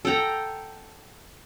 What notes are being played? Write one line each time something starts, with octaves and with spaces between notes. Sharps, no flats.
A4 F#5 G5 A#5